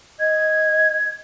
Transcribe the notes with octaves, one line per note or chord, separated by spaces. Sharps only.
D#5 G#6